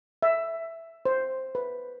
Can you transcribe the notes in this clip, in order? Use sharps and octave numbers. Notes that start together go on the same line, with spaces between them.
E5
C5
B4